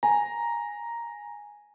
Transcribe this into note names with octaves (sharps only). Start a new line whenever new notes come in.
G#5 A#5